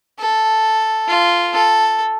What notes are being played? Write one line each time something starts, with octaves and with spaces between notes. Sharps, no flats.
A4
F4
A4